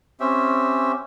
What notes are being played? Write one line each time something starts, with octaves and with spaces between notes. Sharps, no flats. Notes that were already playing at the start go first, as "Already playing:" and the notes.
C4 C#4 G4 E5